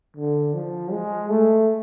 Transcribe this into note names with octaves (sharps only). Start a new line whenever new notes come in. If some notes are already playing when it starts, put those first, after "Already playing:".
D3
F3
G#3
A3